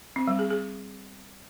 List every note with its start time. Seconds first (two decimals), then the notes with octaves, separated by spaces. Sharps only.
0.16 C4
0.27 G3
0.39 G#4
0.50 G#4